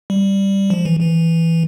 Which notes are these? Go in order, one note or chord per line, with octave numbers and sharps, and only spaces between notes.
G3
F3
E3
E3